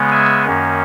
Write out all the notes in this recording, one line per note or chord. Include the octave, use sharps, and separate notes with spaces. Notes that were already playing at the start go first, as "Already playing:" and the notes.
Already playing: C#3 G#3 B3
E5 G#5
F#2 D#3 A#3 C#4